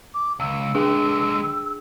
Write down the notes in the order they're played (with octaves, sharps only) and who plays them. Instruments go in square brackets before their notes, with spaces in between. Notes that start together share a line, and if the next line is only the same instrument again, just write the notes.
[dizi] D6
[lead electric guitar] C#2 [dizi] E6
[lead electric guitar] D3 G#3 [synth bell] D4 G#4 G5